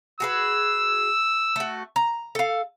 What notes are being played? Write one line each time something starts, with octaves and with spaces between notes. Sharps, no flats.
F#4 G#4 B4 E6
A3 F#4
A#5
A4 F5